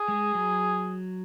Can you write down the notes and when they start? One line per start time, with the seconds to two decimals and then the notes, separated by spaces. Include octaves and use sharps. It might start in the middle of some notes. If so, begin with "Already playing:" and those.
Already playing: G#4
0.08 G#3
0.35 F#3